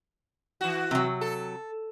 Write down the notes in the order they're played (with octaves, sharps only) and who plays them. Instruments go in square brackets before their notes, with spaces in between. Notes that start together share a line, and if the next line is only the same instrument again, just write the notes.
[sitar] E3 F#4
[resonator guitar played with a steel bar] C3 F#3
[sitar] A4